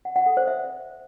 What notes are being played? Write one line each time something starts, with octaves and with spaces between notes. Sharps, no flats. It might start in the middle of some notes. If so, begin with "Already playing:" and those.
F#5
F#5
A4
C5
E5